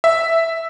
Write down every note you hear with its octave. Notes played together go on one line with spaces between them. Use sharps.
E5